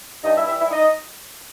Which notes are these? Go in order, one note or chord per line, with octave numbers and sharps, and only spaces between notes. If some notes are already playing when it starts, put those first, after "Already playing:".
G2 D#4 D#5
E4 E5
E3 G3 E4 E5
E4 E5
D#4 D#5